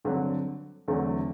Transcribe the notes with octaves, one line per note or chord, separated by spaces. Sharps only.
G2 D3 F#3 C4
E2 D3 F#3 A3 C4